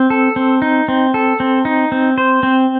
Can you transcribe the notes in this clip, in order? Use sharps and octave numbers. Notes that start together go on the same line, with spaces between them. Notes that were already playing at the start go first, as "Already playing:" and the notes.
Already playing: C4
A4
C4
D#4
C4
A4
C4
D#4
C4
C5
C4